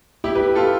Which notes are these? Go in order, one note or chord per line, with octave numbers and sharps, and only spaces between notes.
E4 G4
G4 B4
F4 A4